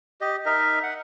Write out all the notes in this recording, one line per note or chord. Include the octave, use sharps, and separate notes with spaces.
G4 D#5
D#4 A#4 D#5 E5
F#5